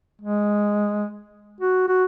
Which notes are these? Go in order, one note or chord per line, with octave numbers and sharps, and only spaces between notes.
G#3
F#4
F#4